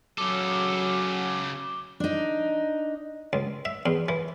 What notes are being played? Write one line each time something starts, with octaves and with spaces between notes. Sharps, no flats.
C#3 F#3 A4 D6 G7
D4 D#4
C#2
E5
E2
E3